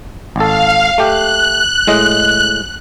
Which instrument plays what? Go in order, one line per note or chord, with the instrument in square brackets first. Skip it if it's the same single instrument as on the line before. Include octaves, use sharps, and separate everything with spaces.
[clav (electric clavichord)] G#1 A4 [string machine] F5
[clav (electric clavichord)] A3 G4 [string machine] F#6
[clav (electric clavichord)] A2 G#3 D#5